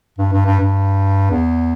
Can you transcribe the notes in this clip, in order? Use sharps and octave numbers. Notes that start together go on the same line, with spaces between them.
G2
G2
G2
G2
E2